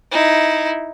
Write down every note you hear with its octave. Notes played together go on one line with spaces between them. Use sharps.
D#4 E4